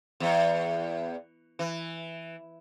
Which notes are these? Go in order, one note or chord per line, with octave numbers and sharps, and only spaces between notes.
E2
E3